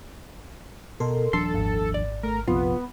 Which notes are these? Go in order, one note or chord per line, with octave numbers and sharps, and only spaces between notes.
B2 A4 A#4 C6
D#1 F3 D4 A4 C6
G#1
D5
A3 A#4
A#1 F2 C3 B3 F4